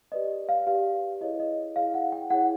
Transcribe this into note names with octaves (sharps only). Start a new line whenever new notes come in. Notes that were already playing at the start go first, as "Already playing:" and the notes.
G4 B4 D5 D#5
F5
G4 B4 D5 F5
E4 G#4 C#5 D#5
D#5
E4 G#4 C#5 F5
F#5
G5
E4 G#4 C#5 F#5